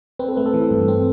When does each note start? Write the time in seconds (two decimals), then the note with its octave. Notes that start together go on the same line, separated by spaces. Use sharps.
0.19 C4 B4
0.29 A4
0.37 A3 B4
0.46 A4
0.54 E3
0.71 G2
0.88 C4